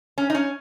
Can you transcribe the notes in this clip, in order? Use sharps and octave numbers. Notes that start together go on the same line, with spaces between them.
C#4
D#4
C#4